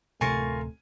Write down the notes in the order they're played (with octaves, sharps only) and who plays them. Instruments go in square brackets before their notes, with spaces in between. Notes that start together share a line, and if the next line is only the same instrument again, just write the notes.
[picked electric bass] D1 C3 C4 [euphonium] A3 [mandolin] F4 A#4 C#6 [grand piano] G#5